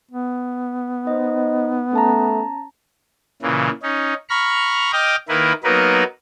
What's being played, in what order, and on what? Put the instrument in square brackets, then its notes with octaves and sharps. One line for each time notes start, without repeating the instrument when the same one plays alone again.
[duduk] B3
[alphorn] D#4 [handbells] C5 D#5
[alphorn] A3 [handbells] C#4 A5 A#5
[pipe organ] A#2 C#3 E3
C#4 D#4
A#5 B5 C#6 F6
D#5 G5 D6 D#6 F6
D#3 A#3 E4 A#4 B4
F#3 A#3 B3 D#4 A#4 B4